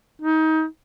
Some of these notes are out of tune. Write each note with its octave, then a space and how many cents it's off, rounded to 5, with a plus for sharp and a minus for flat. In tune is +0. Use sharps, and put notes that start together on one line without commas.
D#4 +25